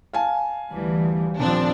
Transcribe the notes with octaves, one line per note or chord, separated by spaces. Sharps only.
F5 G#5 A5
D2 E3 G3
D#1 F3 C4 D4